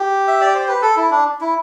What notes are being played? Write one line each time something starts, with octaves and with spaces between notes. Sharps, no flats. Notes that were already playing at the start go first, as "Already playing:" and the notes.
Already playing: G4
E5
D5
C5
B4
A4
E4
D4
E4